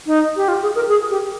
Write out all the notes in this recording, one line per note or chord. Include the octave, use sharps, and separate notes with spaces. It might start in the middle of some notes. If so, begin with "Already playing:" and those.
D#4
G4
F4
G#4
A#4
G#4
G4